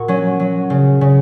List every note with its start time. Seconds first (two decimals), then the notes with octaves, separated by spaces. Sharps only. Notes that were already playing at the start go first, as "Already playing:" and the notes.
Already playing: A#2 F#4 A#4
0.08 F#3 C#4
0.40 F#3
0.70 C#3
1.01 C#3